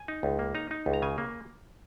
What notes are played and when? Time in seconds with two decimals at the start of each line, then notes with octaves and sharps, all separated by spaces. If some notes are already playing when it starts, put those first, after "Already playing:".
Already playing: G#5
0.08 D#4
0.23 C#2
0.39 A#3
0.55 D#4 A#5
0.71 D#4
0.86 C#2
0.93 A#5
1.02 C#3 G#5
1.18 A#3